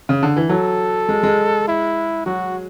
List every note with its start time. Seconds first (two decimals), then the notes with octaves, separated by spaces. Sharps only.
0.09 C#3
0.23 D3
0.37 E3
0.49 F#3 A4
1.09 G#3
1.23 G#3
1.68 E4
2.26 F#3 F#4